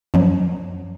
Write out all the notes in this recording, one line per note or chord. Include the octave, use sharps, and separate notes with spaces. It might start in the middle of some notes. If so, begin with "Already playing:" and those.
F#2 F3 F#3